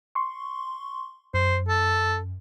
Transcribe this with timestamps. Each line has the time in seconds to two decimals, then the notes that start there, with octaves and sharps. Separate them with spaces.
0.15 C6 C#6
1.34 F#2 C5
1.69 A4